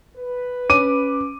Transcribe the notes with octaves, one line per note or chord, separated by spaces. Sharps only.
B4
C#4 D6 D#7